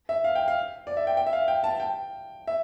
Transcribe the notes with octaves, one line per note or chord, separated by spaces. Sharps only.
E5
F5
G5
F5
D5
E5
G5
G5
E5
F5
G5
A5
G5
E5